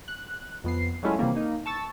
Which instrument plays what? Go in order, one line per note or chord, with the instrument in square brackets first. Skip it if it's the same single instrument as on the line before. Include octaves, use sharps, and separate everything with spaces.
[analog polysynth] F#6
F2 B3 C7
F#3 G#3 A3 C#4 E4 F4
C3 D#3 E3 G3 A#3
A#3 D#4
A5 C#6 E6 A6